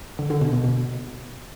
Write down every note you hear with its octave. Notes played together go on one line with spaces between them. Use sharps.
D3
D3
B2
B2
B2